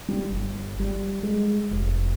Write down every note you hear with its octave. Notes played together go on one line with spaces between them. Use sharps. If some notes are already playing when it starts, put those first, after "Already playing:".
G3
G1
G3
G#3
F1